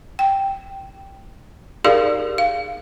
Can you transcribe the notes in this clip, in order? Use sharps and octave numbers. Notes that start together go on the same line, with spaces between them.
G5
D#4 G4 G#4 A#4 D5 F5
F5